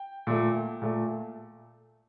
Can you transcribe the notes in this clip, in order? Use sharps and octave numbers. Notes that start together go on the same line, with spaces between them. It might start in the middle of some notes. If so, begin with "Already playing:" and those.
Already playing: G5
A#2 A3
A#2 A3